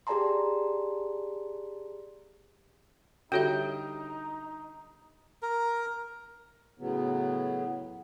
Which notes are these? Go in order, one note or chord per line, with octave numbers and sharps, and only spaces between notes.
G4 G#4 D5 A5 A#5 C6
D3 G3 D#4 F#4 C#5 E5 G5
A#4
A2 C#3 F#3 B3